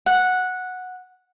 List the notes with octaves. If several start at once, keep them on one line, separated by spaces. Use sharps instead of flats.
F#5